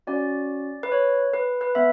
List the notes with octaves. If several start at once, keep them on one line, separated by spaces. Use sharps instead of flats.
C#4 F#4 D5
B4
C#5
B4
B4
B3 E5